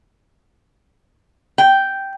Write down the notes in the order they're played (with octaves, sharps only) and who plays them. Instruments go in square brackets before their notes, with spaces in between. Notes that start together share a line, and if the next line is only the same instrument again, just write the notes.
[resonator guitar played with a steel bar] G5